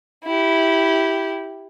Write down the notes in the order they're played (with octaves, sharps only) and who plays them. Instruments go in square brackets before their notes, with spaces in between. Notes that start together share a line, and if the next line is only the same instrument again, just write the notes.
[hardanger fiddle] E4 G4